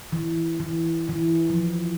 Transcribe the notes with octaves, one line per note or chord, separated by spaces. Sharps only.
E3
E3
E3
F3